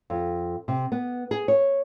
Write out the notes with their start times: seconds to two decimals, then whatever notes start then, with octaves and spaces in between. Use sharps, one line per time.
0.10 F2
0.68 C3
0.92 B3
1.31 G#4
1.48 C#5